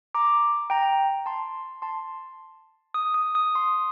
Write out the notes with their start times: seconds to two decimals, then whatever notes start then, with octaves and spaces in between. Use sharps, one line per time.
0.15 A#5 D6
0.70 G5 A#5
1.26 A5 C6
1.82 A5 C6
2.94 D#6
3.14 D#6
3.35 D#6
3.55 C6 D#6